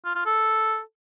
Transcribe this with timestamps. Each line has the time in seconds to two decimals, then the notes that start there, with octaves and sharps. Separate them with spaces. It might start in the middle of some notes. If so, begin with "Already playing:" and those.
0.05 F4
0.16 F4
0.26 A4